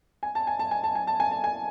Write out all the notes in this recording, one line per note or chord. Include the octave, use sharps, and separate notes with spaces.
G#5
A5
G#5
A5
G#5
A5
G#5
A5
G#5
A5
G#5